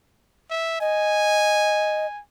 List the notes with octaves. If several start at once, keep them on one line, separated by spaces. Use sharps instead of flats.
E5
D#5 G#5